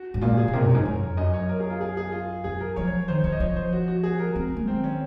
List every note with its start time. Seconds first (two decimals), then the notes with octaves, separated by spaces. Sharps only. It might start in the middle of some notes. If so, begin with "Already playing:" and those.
Already playing: F#4
0.14 G#2
0.22 A#2 F4
0.37 G#4
0.48 A#2
0.53 C3 A#4
0.65 F#2 C#5
0.74 G#2
0.85 F2
1.17 F#2 D#5
1.33 C#5
1.49 A#4
1.60 G#4
1.70 F4
1.81 G#4
1.97 G#4
2.12 F4
2.44 F#2 G#4
2.61 A#4
2.76 F3 C#5
2.87 C#5
3.08 D#3 C5
3.24 F3 C#5
3.32 D#5
3.40 F3 C#5
3.56 C5
3.73 F#4
3.88 F#4
4.03 G#4
4.19 A#4
4.36 C4
4.57 A#3
4.67 D#3 C4
4.84 C#4